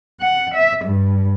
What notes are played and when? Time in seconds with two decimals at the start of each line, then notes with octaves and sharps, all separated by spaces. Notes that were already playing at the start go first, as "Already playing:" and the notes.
0.19 F#5
0.54 E5
0.83 G2